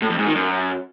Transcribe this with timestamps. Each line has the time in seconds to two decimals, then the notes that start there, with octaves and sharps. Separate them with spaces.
0.02 A2
0.10 F2
0.18 G#2
0.27 D#3
0.35 F#2